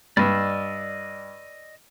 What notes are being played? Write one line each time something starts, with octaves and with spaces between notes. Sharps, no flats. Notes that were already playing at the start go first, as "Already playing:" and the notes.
G2 D5 D#5 E6